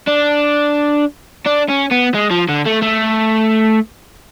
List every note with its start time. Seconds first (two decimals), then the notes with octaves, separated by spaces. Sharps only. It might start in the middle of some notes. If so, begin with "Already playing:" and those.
0.08 D4
1.46 D4
1.69 C#4
1.91 B3
2.15 G#3
2.31 F3
2.49 D3
2.66 A3
2.82 A3